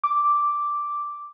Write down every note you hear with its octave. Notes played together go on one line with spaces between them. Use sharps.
D6